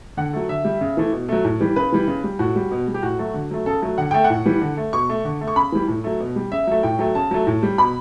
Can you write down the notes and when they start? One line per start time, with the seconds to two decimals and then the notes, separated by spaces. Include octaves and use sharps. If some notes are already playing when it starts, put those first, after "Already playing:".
0.17 D3 F#5
0.33 F#3 A3
0.49 D3 E5
0.65 G3
0.81 C#3
0.97 E3 A3
1.13 B2
1.29 F#3 A3
1.44 A2
1.60 E3 G3
1.76 C#3 B4
1.92 E3 G3
2.08 C#3
2.24 G3
2.39 A2 F#4
2.56 G3
2.71 B2
2.87 G3
2.94 G4
3.03 A2 F#4
3.19 F#3 A3
3.34 D3
3.51 F#3 A3
3.66 C#3 A4
3.82 F#3 A3
3.98 D3 F#5
4.11 A3 G5
4.24 F#5
4.30 A2
4.45 E3 G3
4.61 D3
4.77 A3
4.93 B2 C#6
5.09 A3
5.25 D3
5.41 A3
5.48 C#6
5.56 C#3 B5
5.72 E3 G3
5.88 A2
6.04 F#3 A3
6.20 B2
6.36 G3
6.52 C#3 E5
6.67 F#3 A3
6.83 A2 G5
6.99 F#3 A3
7.15 C#3 A5
7.31 F#3 A3
7.47 A2
7.63 G3
7.78 B2 B5